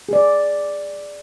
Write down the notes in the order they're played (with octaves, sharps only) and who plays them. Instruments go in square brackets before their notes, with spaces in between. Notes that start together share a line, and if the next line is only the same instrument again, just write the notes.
[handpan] G#4 D5